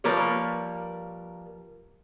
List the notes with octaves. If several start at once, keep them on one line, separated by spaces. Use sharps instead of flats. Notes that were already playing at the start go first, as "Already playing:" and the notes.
F3 G3 A#3 A#4 B4 C#5